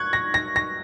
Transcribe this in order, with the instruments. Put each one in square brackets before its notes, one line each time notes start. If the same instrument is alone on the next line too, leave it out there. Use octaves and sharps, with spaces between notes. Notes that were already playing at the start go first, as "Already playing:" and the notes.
Already playing: [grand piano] C#6 F#6 G#6
A#6
A#6
A#6